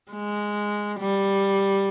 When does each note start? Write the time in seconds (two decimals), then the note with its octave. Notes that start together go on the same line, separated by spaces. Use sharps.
0.12 G#3
1.00 G3